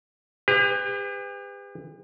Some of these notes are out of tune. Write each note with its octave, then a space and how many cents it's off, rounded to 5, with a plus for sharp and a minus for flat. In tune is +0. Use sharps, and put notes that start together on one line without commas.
G4 +45 B4 +30